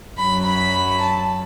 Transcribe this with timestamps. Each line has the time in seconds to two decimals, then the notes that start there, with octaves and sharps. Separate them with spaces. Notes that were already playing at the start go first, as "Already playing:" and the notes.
0.17 F#2 F#3 B5
0.45 B5
1.00 A5